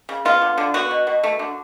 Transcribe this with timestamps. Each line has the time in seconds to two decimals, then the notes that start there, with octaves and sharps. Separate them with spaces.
0.09 C#3
0.25 B3 F4
0.42 D3
0.58 D3
0.74 B3 F#4
0.91 B2
1.07 B2
1.23 A3
1.39 D3